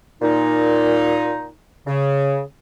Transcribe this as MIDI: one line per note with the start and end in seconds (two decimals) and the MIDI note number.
0.22 1.50 46
0.22 1.50 63
1.87 2.41 49